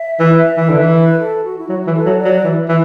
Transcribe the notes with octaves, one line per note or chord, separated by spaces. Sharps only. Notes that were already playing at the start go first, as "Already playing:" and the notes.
Already playing: E5
E3
E3
D3
E3
B4
A4
F#4
E4
F#3 F#4
E3
A4
F#3
D5
F#3
E3
E3